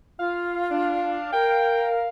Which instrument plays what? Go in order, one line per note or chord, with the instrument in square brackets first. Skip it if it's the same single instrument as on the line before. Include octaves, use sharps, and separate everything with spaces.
[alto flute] F4 [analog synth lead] F5
[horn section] D4
[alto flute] A#4 [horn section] G5